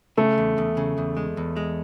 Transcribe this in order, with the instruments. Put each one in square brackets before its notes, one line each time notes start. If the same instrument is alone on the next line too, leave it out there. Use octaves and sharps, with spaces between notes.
[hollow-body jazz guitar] C#3 [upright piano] A3
[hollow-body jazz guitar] E2
E2
C#3
E2
G#3
E2
G#3